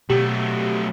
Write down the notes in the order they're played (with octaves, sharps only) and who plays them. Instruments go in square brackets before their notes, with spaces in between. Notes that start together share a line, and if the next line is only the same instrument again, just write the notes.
[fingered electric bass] B2 [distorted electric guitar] F#3 A3 [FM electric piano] G4